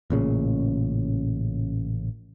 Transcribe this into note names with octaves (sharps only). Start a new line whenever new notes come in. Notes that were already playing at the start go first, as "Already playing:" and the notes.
A1 A#2 C#3